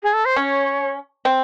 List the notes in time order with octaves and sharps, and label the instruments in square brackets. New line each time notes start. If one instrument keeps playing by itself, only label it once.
[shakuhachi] G#4
A4
C5
[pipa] C#4 [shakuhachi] C#5
[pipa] C4